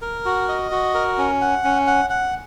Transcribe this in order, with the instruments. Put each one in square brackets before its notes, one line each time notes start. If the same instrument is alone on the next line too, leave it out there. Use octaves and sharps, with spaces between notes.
[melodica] A#4
F#4
D#5
F#4
A#4
C#4
F#5
C#4
F#5
F#5